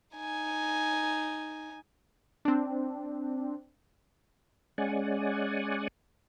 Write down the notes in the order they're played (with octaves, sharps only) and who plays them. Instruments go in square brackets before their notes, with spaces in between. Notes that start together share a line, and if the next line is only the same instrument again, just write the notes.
[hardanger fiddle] D#4 G#5
[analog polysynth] C4 D4
[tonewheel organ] G#3 C#4 D5 F#5 G#5